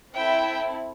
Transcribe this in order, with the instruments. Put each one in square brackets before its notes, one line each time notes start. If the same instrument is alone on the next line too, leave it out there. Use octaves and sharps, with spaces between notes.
[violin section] C4 E4 A4 E5 G5